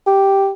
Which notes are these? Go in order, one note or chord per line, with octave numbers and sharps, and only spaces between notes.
G4